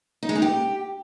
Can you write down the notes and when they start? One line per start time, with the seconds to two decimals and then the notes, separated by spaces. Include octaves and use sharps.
0.23 D#4
0.29 G#3
0.35 D#4
0.42 G4